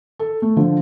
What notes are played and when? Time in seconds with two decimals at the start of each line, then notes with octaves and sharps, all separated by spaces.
0.19 A4
0.42 A3
0.56 D3 F3